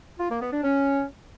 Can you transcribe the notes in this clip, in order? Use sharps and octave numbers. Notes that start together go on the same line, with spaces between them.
F4
A#3
B3
D4
C#4